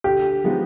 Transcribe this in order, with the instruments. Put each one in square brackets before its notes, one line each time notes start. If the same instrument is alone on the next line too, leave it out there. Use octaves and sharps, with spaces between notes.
[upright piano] D3 [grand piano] G4
[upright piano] F3 G#3 B3 D#4